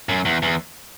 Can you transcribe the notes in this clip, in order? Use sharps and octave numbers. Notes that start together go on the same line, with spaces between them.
F#2
E2
E2